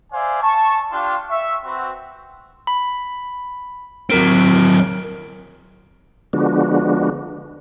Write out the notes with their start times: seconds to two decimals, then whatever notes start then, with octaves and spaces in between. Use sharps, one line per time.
0.13 C5 D5 E5 F5 G#5
0.43 A5 C#6
0.92 D4 F4 G4 F5 G5 A5
1.29 E5 C#6
1.64 C4 F#4 B4
2.67 B5
4.10 F#3 C4 A#4 D7
6.33 D3 F3 G#3 B3 D4 F#4